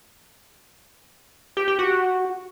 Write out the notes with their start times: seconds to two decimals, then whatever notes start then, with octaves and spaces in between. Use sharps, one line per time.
1.57 G4
1.68 G4
1.79 F#4